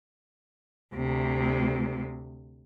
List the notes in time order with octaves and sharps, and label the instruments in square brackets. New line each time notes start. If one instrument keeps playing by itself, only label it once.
[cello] D2 C3